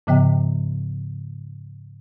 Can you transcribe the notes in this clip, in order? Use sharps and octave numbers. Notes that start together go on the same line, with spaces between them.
G#2 C#3 F3 B3 D#5 G5